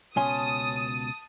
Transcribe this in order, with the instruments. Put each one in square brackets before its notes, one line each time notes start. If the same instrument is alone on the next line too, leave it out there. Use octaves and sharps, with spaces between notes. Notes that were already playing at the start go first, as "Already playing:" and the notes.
[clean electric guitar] C#2 B2 C6 [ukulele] C#4 G#5 [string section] A5 D#6